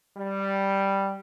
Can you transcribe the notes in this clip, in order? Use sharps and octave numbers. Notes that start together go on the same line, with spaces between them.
G3